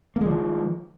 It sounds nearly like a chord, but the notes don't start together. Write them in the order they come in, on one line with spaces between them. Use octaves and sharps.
A#3 G#3 F3 D#3